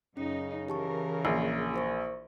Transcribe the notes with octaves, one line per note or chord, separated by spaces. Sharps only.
F#2 C#3 C#4 D#4
E3 G4 A#4 A5 C#6
A#1 C7
E4 C5 C#6